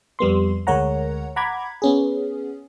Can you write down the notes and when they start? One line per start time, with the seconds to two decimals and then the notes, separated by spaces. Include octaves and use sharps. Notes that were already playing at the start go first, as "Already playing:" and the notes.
0.19 F2 G3 B3 C6
0.67 D2 G#3 A#4 C#5 F#5 A#5
1.36 F#5 A#5 B5 D6 G#6
1.82 B3 C#4 G#4